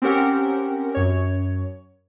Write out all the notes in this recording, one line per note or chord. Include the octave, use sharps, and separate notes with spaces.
C4 C#4 G4 A#4 F#5
F#2 C#5